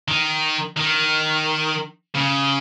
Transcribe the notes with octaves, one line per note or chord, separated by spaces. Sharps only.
D#3
D#3
C#3